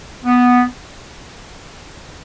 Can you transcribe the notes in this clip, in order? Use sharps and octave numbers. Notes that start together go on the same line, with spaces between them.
B3